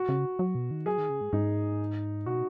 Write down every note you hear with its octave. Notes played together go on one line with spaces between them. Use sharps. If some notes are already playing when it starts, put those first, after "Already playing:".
Already playing: F#4
C#3
F#3
B2
D#3
F#3 G#4
D#3
C#3
G#2
G#2 D#4
B2 F#4